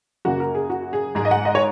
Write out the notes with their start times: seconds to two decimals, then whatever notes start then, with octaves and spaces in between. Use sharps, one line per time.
0.25 F#2 C#3 A#3 F#4
0.40 A#4
0.55 G#4
0.70 F#4
0.93 G#4
1.15 G#2 G#3 G#4
1.25 D#5
1.31 F#5
1.45 D#5
1.55 C#5